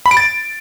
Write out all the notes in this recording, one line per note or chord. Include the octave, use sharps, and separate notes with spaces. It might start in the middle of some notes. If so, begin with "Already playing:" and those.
B5
D7
A6